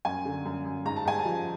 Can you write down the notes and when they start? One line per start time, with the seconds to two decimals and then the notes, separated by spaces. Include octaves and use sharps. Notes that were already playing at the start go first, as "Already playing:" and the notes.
0.05 F#2 G#5
0.25 D3
0.45 F#2
0.65 F#2
0.85 G#2 A#5
0.96 A5
1.05 G#2 G#5
1.19 A5
1.25 F3